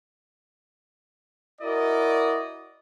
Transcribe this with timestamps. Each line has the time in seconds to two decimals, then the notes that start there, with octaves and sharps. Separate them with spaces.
1.61 E4 F#4 A#4 D5 D#5